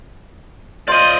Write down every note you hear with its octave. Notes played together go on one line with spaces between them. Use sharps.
F4 C5 D5 D#5